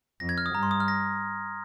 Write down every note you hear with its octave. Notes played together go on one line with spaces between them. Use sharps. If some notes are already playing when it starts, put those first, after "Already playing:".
F2 A#6
G#6
F6
D#6
G2 A#5
C6
D#6
F6
A#6